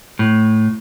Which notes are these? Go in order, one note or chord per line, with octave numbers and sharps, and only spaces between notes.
A2